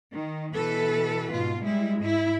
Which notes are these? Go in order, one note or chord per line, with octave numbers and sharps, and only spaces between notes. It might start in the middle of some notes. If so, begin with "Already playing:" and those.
D#3
B2 E3 A4 B4
G#2 B2 F4
G3 G#3 E4
G#2 E4